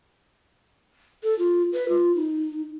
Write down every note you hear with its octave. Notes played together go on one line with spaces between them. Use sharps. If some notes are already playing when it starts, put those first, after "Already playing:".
A4
F4
B4
F4
D#4